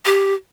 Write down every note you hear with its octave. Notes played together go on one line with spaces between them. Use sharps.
G4